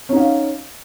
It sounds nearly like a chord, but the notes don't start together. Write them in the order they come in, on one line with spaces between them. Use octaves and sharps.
C#4 D#4 F#5 F5